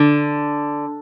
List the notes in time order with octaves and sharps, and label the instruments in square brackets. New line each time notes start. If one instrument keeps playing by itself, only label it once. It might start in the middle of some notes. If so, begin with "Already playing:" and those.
Already playing: [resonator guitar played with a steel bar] D3